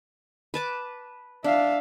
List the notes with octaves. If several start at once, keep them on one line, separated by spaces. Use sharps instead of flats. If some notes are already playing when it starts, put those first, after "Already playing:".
B4 A5 D6
D4 E5 F5